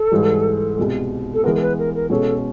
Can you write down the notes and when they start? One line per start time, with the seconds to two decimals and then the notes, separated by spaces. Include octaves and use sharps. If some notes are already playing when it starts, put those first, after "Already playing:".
Already playing: A4
0.12 G#2 E3 G3
0.77 C2 B2 G#3
1.33 A4
1.44 E3 G#3 B3 A#4
1.55 A#4
1.61 B4
1.78 A#4
1.94 A#4
2.10 B2 G#3 C#4 A4